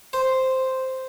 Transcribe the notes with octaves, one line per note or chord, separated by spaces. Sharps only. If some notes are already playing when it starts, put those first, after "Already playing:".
C5